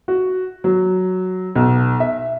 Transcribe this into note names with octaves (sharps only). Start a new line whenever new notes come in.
F#4
F#3
B1
E5